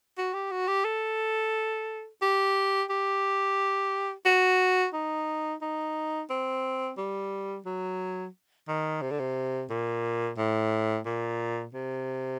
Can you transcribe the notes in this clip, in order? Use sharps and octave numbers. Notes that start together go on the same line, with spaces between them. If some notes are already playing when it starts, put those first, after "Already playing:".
F#4
G4
F#4
G4
A4
G4
G4
F#4
D#4
D#4
C4
G3
F#3
D#3
C3
D3
C3
A#2
A2
A#2
C3